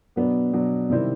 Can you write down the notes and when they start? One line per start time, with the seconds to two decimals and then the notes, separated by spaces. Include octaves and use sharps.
0.16 B2 F#3 B3 D4
0.53 B2 F#3 B3 D4
0.90 C3 D#3 G3 C4 E4